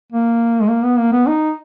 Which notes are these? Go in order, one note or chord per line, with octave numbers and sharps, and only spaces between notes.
A#3
G#3
A#3
B3
A#3
B3
D#4